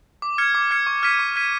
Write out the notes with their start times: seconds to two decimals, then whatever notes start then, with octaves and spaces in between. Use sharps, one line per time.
0.22 D6
0.38 F6 G#6 C#7
0.55 D6
0.71 F6 G#6 C#7
0.87 C#6
1.03 F6 G#6 B6 D#7
1.19 C#6
1.36 F6 G#6 B6 D#7